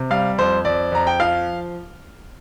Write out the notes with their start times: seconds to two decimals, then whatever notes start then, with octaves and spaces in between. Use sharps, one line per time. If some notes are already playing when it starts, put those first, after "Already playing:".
Already playing: C3
0.10 G3 F5
0.38 F2 C5
0.65 F2 D5
0.92 F2 A#5
1.07 G5
1.20 F3 F5